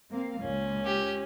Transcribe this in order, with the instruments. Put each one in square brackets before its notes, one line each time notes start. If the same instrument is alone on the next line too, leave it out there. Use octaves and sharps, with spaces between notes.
[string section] A#3 C4 F5
[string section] C#2 A#2 [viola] C#4
[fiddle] G4